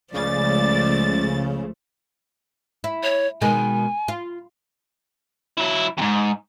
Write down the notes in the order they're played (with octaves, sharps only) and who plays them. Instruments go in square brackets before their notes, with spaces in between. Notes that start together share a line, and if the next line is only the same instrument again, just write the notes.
[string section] C#2 A6 [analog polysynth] C#3 [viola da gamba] F3 A3 [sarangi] D5
[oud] E4
[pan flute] C#5
[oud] B2 D#3 G#3 [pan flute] G#5
[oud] F4
[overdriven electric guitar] F#3 E4
F2 G#2